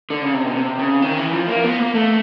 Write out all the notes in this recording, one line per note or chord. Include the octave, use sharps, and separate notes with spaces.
D3
C#3
C3
B2
C3
C#3
D#3
E3
F3
A#3
B3
A#3
A3